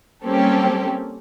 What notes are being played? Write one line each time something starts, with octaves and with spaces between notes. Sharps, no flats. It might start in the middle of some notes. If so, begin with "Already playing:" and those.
G3 A#3 C4 C#4 G4 A4